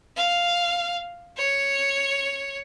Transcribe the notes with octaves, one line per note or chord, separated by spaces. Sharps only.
F5
C#5